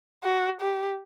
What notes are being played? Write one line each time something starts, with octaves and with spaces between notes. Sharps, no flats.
F#4
G4